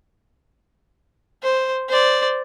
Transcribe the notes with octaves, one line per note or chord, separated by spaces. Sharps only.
C5
C5 D5